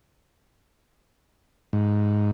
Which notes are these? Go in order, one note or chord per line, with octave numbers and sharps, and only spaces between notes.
G#2